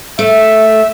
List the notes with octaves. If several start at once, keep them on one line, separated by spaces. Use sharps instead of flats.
A3 E5